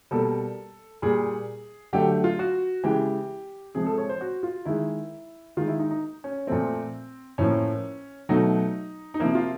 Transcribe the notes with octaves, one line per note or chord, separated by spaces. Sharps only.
B2 G3 A#3 A4
A#2 G3 A#3 G#4
D3 F#3 A3 G4
F4
F#4
C#3 E3 G#3 G4
C3 F3 G#3 G#4
A4
C#5
C5
F#4
F4
D#3 G#3 E4
D#3 G#3 F4
E4
D#4
D#4
C#4
A#2 F3 A3 C4
A2 F3 A#3 C#4
B2 F#3 A3 D#4
D#4
C3 F3 A#3 E4
F4